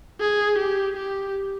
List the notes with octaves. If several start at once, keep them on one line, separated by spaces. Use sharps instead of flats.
G#4
G4
G4